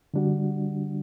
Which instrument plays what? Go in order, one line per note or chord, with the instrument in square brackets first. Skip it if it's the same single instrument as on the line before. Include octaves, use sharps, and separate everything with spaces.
[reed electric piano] D3 G3 D4 F#4